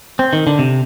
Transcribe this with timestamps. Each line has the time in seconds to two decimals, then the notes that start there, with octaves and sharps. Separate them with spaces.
0.19 C4
0.33 D#3
0.47 D3
0.59 C3